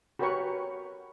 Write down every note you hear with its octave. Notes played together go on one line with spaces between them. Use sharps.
F#4 G4 A#4 B4 C#5 C#6